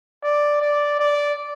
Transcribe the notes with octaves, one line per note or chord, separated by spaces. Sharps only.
D5
D5
D5